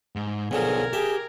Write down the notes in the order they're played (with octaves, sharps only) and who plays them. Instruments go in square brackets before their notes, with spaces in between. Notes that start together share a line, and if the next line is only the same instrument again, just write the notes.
[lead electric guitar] G#2
[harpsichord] B1 D3 F3 [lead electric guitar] B3 C#5 [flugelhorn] G#4 [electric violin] A#4 G#6
[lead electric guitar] G4 [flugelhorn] G#4 [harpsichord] E5